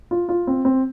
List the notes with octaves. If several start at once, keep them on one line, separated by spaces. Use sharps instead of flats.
F4
F4
C4
C4